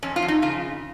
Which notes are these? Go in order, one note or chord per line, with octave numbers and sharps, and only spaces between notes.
F2 C#4
F4
F2
D#4
C#3 F4